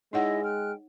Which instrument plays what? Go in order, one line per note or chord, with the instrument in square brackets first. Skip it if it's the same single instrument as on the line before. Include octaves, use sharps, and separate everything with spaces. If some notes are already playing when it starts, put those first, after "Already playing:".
[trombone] G#3 [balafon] D#4 C#5 F#5 [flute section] E4 D#5 E6
[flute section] G5 F6 F#6